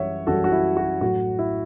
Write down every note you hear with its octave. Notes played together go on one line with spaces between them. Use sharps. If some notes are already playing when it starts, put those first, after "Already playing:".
Already playing: F#2 E3 G3 C#5 E5 F#5
F#2 E3 G3 F#4 A4
F#4
E4
F#4
A2 F#3 F#4
E4